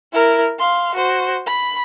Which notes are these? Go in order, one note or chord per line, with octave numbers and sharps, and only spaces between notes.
E4 A#4
F5 C6
F#4 C5
B5